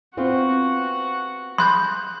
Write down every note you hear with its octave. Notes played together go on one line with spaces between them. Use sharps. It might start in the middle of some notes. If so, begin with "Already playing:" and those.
B3 C4 F4 F#4 F#5
B5 C6 F#6 G6